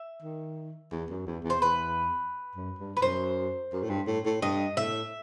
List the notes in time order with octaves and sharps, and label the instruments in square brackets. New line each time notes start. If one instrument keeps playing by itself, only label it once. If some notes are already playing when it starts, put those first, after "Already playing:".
Already playing: [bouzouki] E5
[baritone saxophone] D#3
E2
F#2
E2
E2
[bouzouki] C5
[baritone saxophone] E2 [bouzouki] B4
[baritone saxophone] F#2
G2
[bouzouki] B4
[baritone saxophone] F#2 [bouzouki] C5
[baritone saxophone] F#2
A2
G2
A2
A2
[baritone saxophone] G2 [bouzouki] D#5
[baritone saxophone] A2 [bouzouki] E5